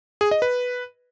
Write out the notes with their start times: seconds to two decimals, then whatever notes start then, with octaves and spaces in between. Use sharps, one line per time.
0.21 G#4
0.31 D#5
0.42 B4